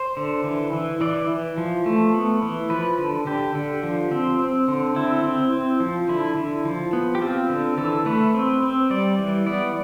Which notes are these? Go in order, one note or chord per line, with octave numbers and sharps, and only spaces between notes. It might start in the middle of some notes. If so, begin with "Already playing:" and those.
Already playing: C5
D3
E3
E3
E3 D5
E3
F3
A3
B3
E3
F3 B4
D3
D3 G4
D3
F3
C4
C4
D3
C4 E4
C4
C4
F3
D3 E4
D3
F3
B3
G4
C4 F4
D3
E3 A4
A3 B4
C4
C4
G3 D5
E3
B3 D5